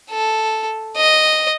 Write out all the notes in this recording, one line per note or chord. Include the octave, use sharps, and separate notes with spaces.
A4
D#5